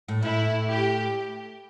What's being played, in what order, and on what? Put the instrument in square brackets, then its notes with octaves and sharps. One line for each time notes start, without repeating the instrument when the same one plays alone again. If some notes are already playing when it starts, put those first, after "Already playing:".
[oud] A2
[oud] A2 [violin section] E4
[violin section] G4